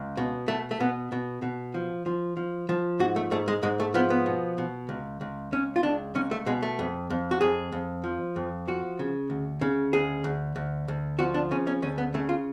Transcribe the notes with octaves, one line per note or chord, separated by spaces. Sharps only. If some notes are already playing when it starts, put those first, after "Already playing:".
Already playing: C#2
B2
B2 A3
A3
B2 B3
B2
B2
F3
F3
F3
F3
G#2 F#4
A3
G#2 A3
G#3
G#2 G#3
A3
F3 B3
B3
B2
B2
C#2
C#2
C#2 C#4
F4
C#2 D4
C#2 C#4
A3
B2 G#3
A3
F2
F2
F#4
F2 G#4
F2
F3
F2
F3 F#4
C#3
D2
C#3
D2 G#4
D2
D2
D2
F3 F#4
D4
C#3 C#4
C#4
D2 C#4
B3
C#3 A3
F4